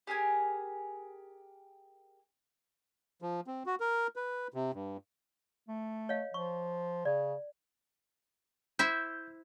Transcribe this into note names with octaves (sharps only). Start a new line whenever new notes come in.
G4 G#4 A#4 G#5
F3
C4
F#4
A#4
B4
C3
G2
A3
C#5 D#5 F5
F3 C#6
C#3 D5
E4 C5 E5 G6